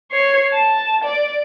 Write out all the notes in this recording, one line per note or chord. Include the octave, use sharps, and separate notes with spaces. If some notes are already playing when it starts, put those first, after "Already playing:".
C#5 C7
A5
D5